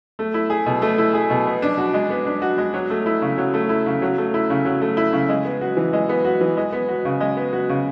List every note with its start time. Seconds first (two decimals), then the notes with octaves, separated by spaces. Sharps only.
0.19 A3
0.34 E4
0.50 G#4
0.66 B2
0.82 A3
0.98 E4
1.14 G#4
1.30 B2
1.46 B3
1.62 D4
1.78 F#4
1.94 G#3
2.10 B3
2.26 D4
2.42 F#4
2.58 G#3
2.74 F#3
2.90 A3
3.06 E4
3.22 C#3
3.38 F#3
3.54 A3
3.69 E4
3.86 C#3
4.02 F#3
4.18 A3
4.34 E4
4.50 C#3
4.65 F#3
4.81 A3
4.97 E4
5.13 C#3
5.29 G#3
5.45 B3
5.61 F#4
5.77 E3
5.93 G#3
6.09 B3
6.25 F#4
6.41 E3
6.57 G#3
6.73 B3
6.89 F#4
7.05 C#3
7.20 G#3
7.37 B3
7.53 F#4
7.69 C#3